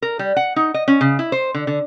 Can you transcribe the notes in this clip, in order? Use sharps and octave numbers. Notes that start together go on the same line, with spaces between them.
A#4
G3
F#5
D#4
D#5
C#4
C#3
E4
C5
D3
D3